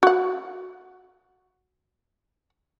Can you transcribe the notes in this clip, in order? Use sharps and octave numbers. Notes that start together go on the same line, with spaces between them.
F#4 F#5